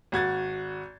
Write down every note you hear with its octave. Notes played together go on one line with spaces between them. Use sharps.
G#1 F#4 G#6 A6